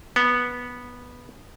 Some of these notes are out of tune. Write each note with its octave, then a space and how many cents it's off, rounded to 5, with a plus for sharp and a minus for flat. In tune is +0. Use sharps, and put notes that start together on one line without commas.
B3 -10